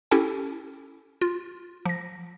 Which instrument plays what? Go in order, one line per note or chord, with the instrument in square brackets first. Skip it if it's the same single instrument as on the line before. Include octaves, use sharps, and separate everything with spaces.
[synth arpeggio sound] C#4 E4 G4 A4 G5 G#5
F4
F3 A#6